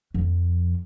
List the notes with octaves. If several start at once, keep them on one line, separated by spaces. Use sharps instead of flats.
F2